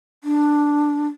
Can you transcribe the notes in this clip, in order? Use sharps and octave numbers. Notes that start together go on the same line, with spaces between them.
D4